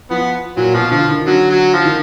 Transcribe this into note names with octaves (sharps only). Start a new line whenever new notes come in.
F3 B3
A#2 F#3
B2 F3
D3 F3
D#3
D3 F#3
F#3
F3
D#3